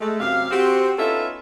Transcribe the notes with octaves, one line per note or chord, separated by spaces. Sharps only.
G#3 A3
F#2 C3 G4 F5
C4 F#4 G4
B3 C#4 D#4 F4 A4 E5